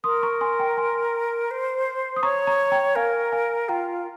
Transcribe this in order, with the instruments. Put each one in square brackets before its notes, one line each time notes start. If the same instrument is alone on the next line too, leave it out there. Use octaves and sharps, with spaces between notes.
[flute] A#4 [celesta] C6 D#6
[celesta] A#5 C#6
G#5 C6
G5 A#5
G#5 C6
[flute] C5
[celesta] D#6
[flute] C#5 [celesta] A#5 C#6
[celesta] A#5 C#6
G5 A#5
[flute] A#4 [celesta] F5 G#5
[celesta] F5 G#5
[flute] F4 [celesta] G5 A#5